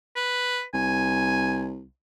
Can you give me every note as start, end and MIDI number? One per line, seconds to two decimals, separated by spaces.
0.16 0.63 71
0.74 1.85 36
0.74 1.66 80